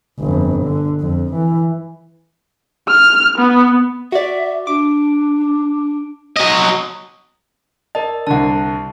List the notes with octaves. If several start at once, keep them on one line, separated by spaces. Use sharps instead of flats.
G1 F2
D3
F2
E3
F6
B3
F#4 D5 E5
D4 D6
F#3 D#5
A#4 D5 D#5 A5
C2 D3 F#5 A5